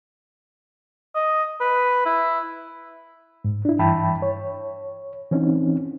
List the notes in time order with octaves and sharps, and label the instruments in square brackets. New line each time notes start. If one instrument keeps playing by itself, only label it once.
[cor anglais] D#5
B4
E4
[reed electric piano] G#2
D4 E4
G2 E3 E5 G5 A5 B5
C#5
E3 C4 C#4 D#4